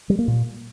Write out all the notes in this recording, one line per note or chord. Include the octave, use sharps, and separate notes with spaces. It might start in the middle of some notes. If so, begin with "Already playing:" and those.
G3
A#3
A#2